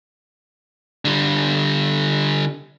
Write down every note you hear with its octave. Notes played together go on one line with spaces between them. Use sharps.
D3 G3